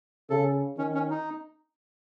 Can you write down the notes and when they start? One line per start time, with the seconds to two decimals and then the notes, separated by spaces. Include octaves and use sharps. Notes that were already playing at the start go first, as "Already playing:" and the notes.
0.30 C#3 A4
0.78 D#3 C#4
0.94 C#4
1.10 D#4